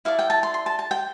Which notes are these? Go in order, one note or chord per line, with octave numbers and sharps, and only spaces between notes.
E4 A4 D5 F5
G5
A5
C6
C6
A5
A5
G5